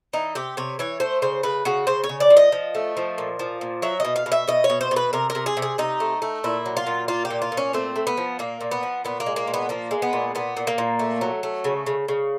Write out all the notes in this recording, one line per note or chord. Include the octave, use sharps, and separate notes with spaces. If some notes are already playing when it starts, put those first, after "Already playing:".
E3 D#4
C3 G4
C3 C#5
E3 C#5
A3 C5
C#3 C5
C#3 B4
C#3 F#4
C#3 C5
C#5
C#3
D5
F3
D#5
F3
A3
F3
A#2
F3
A#2
F#3 E5
B2 D#5
F5
B2
E5
B2 D#5
C#5
B2
C5
B2
B4
C3 A#4
A#4
C3
G#4
C3
G#4
C3 D#4
A3
A3
A#2 E4
F#3
F4
A#2
A#3 F4
G4
A#2
F4
A#2
C#4
A3 C4
A3
B3
F3
A#2 A#3
A#2
B3
F3
A#2 B3
A#3
G#3
A#3
A#2
B3
F3 A#3
G#3
B3
A#2
A#2 B3
A#2
A#3
A#2
A3
F#3
A3
C#3
C#3
C#3